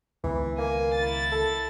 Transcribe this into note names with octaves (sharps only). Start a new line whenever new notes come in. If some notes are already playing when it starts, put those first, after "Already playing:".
C#2 D#3 E3 B3
A#3 G#5
E4 A6
A4